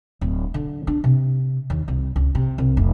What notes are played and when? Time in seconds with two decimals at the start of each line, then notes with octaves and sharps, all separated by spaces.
0.21 D1
0.54 D3
0.87 D4
1.04 C3
1.70 D#2
1.88 C2
2.16 C#2
2.35 C3
2.58 C2
2.77 F1